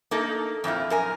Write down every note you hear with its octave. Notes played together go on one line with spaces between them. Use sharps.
A#3 D#4 A4
F2 A#2 E4 F4
F#2 A#4 G#5